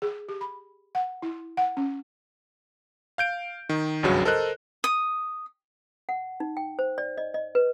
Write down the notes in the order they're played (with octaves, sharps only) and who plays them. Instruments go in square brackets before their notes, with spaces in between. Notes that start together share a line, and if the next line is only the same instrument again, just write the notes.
[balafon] G#4
G4
B5
F#5
E4
F#5
C#4
[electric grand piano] F5 G6 D7
D#3
G#1 C#2 G2 C#3 F#3 F#4
A4 A#4 C5 D#5 F#6
[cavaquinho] D#6
[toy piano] F#5
D#4
G5
C5
D5
D#5
D#5
B4